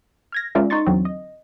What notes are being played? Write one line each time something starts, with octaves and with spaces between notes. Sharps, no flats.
F6 G#6 A#6
G#3 C#4 F4 A#4 D5 E5
D#4 C6 C#6 A6
E2 D3 F#3 C4
D#5